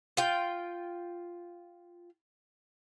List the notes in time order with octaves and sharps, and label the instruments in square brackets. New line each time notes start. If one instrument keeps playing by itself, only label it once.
[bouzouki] F4 G5